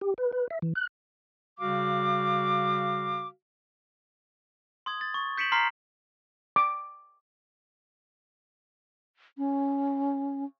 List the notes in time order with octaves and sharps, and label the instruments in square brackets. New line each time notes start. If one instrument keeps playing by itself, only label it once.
[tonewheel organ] G4
B4
B4
E5
E3
F#6
[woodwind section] C#3 G3 F#4 F5 D6
[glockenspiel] C6 D#6 G#6
A6
C#6
G6 B6 C#7 D7 E7 F#7
A#5 C6 F6 B6 C7
[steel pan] D6
[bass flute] C#4